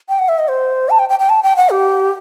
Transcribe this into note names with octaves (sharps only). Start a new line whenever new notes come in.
G5
F#5
E5
D#5
C5
A5
G5
G5
G5
A5
G5
F#5
G4